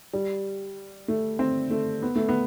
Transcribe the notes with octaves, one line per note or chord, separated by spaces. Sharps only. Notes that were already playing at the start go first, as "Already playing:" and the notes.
G3
A3
C4
A3
B3
A3
B3